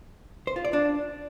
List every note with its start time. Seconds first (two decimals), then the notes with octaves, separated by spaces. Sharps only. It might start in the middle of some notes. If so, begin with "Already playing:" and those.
0.47 C5
0.56 F4
0.65 D5
0.73 D4